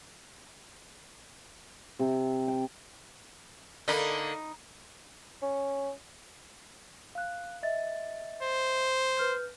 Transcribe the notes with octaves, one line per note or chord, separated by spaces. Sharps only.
C3
G5
D3 A#3 D#4 B5
C#4
F5 F#6
D#5 E5 A6
C5
B4 F6 G6